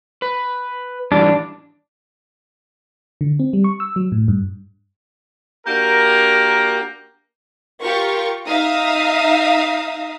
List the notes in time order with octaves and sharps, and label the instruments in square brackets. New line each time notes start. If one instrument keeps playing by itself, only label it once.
[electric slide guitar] B4
[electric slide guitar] G#2 E3 G3 [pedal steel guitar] D4
[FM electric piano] D3
C4
G3
C#6
E6
F#3
A2
G2
[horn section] A#3 D4 F#4 G4 A#4
[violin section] F4 G4 A#4 C#6
D#4 E5 F5 A#5 D#6